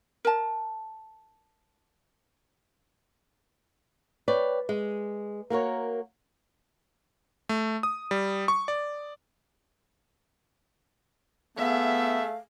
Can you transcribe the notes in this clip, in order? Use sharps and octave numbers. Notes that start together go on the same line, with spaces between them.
A#4 A5
B4 C#5 D5 G5
G#3
A#3 F#4 A#4 C#5
A3
D#6
G3
C#6
D5
A3 B3 G#4 E5 F5